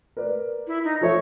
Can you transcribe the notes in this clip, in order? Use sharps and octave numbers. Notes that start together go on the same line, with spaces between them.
A#4 B4 D5
E4
D#4
F3 A4 C#5 E5